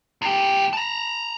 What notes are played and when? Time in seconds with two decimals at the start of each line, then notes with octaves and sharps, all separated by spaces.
0.22 E2 G4
0.73 A5 A#5